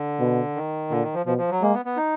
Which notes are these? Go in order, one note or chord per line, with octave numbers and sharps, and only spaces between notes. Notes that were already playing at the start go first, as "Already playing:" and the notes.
Already playing: D3
B2
D#3
A#2 D3
D#3
F3
B2 F3
F3
F#3
G#3 A#3
B3
B3
D#4